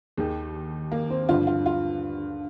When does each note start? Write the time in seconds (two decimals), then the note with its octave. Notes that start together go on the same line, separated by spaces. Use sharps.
0.17 D#2 D#3 G#4
0.92 A#3
1.10 C4
1.29 G2 D3 F3 F4
1.47 F4
1.66 F4